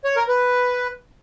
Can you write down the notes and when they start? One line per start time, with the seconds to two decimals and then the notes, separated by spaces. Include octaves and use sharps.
0.04 C#5
0.16 A#4
0.28 B4